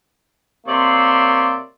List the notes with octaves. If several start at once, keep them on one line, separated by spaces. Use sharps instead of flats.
C3 A#3 C#5 D5 E5 C6